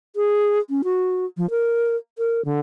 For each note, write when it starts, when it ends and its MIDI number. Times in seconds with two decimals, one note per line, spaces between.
0.16 0.59 68
0.70 0.82 61
0.84 1.26 66
1.37 1.49 53
1.50 1.96 70
2.18 2.44 70
2.45 2.60 50